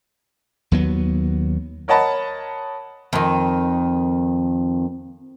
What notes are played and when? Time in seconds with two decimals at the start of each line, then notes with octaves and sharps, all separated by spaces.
0.72 D#2 F#3 B3
1.88 A#4 C#5 D#5 F#5 A5 B5
3.13 F2 D#3